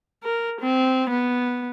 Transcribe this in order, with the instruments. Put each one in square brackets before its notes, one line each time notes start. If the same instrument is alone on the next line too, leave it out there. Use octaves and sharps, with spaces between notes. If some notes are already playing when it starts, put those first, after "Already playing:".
[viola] A#4
C4
B3